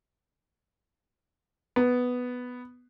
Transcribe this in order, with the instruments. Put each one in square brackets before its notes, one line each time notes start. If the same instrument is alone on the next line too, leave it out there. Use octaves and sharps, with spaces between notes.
[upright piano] B3